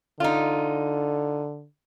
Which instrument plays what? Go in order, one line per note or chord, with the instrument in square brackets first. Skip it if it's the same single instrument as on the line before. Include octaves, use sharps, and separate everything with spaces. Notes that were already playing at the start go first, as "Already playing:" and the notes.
[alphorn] D3 [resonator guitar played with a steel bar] D#4 F4